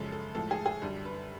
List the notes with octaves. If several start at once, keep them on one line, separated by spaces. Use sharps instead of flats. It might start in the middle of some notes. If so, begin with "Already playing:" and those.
Already playing: F#2 C#3 F3 G#3 A4
A4
A2 F3 G#3 A4
G#4
G#4
F#2 D3 G3
B4